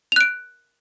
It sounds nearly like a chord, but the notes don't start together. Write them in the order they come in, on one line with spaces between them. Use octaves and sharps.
F7 F#6 D7